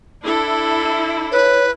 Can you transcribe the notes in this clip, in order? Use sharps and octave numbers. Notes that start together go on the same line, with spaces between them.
D4 E4 A4
B4 C#5